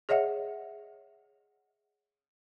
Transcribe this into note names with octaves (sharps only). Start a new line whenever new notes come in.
G#4 C#5 D#5 E5 F#5